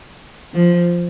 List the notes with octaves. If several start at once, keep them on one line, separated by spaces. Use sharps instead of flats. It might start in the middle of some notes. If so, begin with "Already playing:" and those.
F3